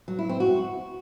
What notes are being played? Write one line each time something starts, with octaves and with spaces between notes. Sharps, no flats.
F#3
E4
C4
F#4